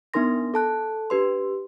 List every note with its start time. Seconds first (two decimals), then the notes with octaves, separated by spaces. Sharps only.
0.14 B3 D4 D#4 A#4 C6 A#6
0.54 A4 A5 F#6
1.10 D4 G4 B4 C6